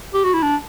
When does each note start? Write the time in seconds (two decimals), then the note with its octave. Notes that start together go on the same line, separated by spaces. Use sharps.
0.14 G4
0.24 F#4
0.33 E4
0.42 D4